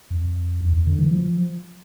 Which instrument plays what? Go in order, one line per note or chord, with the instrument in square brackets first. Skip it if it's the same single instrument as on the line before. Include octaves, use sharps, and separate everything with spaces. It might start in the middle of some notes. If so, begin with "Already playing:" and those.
[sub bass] F2
E2
F2
D3
E3
F3